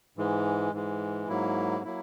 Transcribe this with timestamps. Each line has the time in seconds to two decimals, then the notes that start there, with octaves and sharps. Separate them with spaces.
0.17 G#2 E3 G#3
0.72 G#2 E3 G#3
1.28 G#2 F#3 A#3 E4
1.85 F#3 A#3 E4